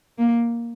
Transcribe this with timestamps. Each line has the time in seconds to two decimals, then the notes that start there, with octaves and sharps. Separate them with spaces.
0.19 A#3